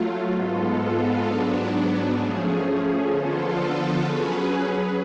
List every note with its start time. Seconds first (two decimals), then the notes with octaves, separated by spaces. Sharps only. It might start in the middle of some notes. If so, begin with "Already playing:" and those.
Already playing: F#3 A3 F4
0.33 G#2 G#3 B3 F4 A4
1.25 G#2 F#3 B3 D4
2.16 F3 A3 C#4 G#4
3.08 D3 F3 B3 F4 A4
4.00 F#3 C#4 G#4 B4